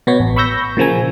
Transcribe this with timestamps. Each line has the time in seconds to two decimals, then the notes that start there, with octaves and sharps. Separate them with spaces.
0.07 B2 B3 C#5
0.20 A1
0.36 B5 C#6 E6 G6 A#6
0.77 A#2 C#3 F3 A#3 G#5